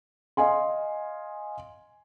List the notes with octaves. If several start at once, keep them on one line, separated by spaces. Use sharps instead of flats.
D#5 F5 G#5 C6